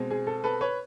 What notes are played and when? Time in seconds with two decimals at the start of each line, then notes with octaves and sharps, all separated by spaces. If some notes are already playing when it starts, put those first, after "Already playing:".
Already playing: B2 G#3 C4
0.11 G#4
0.27 A4
0.44 A4 B4
0.61 B4 C#5